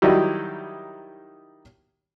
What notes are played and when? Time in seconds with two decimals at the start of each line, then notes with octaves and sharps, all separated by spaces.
0.02 D#3 F#3 G3 D#4 E4 G4